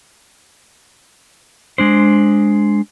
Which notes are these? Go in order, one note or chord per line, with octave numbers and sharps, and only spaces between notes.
G#3 D4 C5